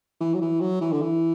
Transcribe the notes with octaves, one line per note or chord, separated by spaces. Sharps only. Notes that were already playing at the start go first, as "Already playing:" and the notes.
E3
F#3
E3
F#3
E3
D3
E3